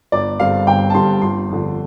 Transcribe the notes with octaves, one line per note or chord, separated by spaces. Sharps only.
G1 D5
G2 D3 G3 C4 F5
G1 G5
A5
G2 D3 G3 C4 C6
G1 C6
F2 D3